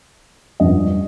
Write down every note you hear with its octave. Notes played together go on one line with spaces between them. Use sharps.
G2 F3 D#5